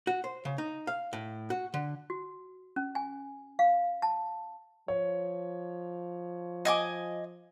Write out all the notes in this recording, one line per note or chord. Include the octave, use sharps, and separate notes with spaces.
F#4
C5
C#3
D#4
F5
A2
F#4
D3
F#4
C#4
G#5
F5
A5
F3 C#5
D#5 G#5 D6